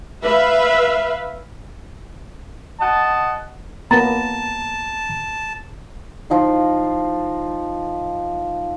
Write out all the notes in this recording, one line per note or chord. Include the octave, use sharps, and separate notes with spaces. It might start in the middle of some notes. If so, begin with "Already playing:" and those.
B4 E5 F5
D#5 F#5 A5
A#3 B3 A5 A#5 A6
F3 D#4 C6